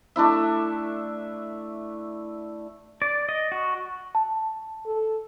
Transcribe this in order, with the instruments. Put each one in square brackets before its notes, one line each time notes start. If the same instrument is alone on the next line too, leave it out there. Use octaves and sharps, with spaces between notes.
[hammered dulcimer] A3 D4 E4 E5
[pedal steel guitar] D5
D#5
F#4
[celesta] A5
[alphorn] A4